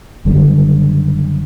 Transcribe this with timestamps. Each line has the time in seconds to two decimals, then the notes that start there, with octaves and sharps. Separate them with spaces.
0.25 F#1 F#2 D3 G3